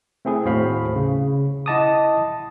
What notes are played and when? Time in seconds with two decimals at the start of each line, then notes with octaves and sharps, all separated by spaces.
0.25 A3 C4 E4 G#4
0.45 D#2 A2 F#4 C5 F5 B5
0.95 C#3
1.66 E4 D#5 F#5 A5 D6 D#6